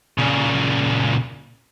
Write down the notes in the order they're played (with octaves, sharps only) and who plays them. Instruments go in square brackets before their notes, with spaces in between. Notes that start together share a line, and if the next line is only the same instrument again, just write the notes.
[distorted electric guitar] A#2 C#3